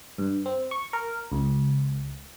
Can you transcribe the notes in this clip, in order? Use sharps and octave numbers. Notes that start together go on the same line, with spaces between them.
G2
C4
C#6
A#4
C#2